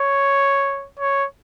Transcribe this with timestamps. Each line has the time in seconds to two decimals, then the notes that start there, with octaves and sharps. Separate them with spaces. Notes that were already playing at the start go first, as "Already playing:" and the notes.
Already playing: C#5
0.99 C#5